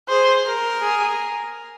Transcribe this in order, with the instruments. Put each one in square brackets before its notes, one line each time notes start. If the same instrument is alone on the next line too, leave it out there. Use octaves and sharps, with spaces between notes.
[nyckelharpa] G#4 [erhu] C5
[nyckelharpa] A#4
[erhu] G#4